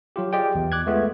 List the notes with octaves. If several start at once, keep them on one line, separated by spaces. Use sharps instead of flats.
F#3 F4 G4
F4 G4 G#4 D5 D#5 G5
B1 E2
D6 F#6 G#6
G#3 A3 B3 F4